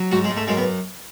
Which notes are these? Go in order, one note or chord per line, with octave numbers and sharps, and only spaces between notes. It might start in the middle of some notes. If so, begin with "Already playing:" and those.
Already playing: F#3
G#2 F#4
G#3
G#2
A3
F#2 G#3
B3